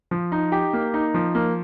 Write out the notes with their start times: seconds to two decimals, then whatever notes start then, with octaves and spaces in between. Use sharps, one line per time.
0.11 F3
0.32 D#4
0.52 G4
0.73 A#3
0.94 D#4
1.14 F3
1.35 A#3